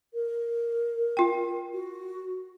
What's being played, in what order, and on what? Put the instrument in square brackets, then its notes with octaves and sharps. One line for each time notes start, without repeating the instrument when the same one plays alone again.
[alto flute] A#4
[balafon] F4 G5
[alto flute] F#4